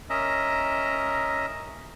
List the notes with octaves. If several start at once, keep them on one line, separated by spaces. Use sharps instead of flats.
C#4 A#4 D#5 E5 A#5